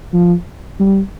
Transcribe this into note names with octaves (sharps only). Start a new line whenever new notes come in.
F3
G3